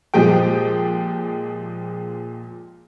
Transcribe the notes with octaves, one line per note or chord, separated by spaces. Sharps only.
A#2 F3 G#3 G4 G5